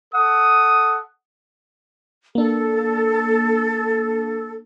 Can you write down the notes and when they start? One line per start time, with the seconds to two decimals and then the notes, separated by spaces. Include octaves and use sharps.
0.13 A4 F#5 D#6
2.35 A#3 D4 A4